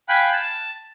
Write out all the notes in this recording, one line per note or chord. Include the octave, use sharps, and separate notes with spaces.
F5 G5 G#5 B5 F#6
A5